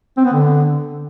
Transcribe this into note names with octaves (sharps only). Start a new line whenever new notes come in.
C4
B3
D3